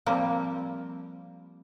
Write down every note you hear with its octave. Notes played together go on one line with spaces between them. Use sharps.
F3 G3 A#3 C4